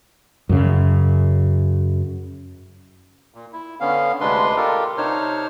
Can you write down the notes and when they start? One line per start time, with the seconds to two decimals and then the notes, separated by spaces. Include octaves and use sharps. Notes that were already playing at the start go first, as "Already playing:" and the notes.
0.50 F#2 C#3
3.34 A#2
3.53 E4
3.80 D3 B3 C#4 F5
4.21 D2 C3 G#3 D4 B4 C6
4.57 F4 G4 A4 A#4
4.97 C3 D4 D#4 C5 C#5 F6